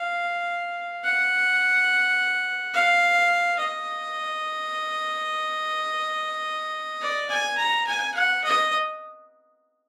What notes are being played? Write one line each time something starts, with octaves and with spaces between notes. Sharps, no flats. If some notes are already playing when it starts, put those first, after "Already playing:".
Already playing: F5
F#5
F5
D#5
D5
G#5
A#5
G#5
F#5
D#5